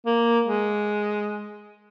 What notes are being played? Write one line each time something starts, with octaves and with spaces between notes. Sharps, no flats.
A#3
G#3